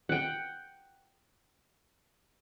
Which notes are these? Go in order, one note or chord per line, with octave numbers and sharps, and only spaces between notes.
F#5 G5